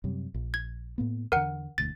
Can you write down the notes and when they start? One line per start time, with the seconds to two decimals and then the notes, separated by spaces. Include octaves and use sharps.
0.04 F#2 C3 G3
0.34 A#1
0.54 G#6
0.98 A2 A#3 B3
1.32 E2 D3 A#4 F#5
1.78 E1 D2 A6